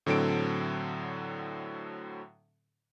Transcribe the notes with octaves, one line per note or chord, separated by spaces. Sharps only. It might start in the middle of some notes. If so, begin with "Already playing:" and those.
A2 D3 F#3 C4 A4 D7